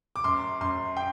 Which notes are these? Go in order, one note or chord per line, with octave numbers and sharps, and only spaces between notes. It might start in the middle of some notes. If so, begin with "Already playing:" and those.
D6
F#2 C6
F#2 C6
G5